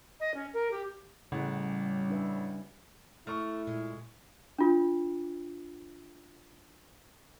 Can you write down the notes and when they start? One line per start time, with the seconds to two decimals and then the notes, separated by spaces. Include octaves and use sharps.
0.20 D#5
0.34 C#4
0.53 A#4
0.71 G4
1.32 A1 C#3 G3 C#4 E4 F#5
2.10 D4 B4 E5
3.27 A3 E4 C#6 F6
3.67 A#2 G#3
4.59 D4 F4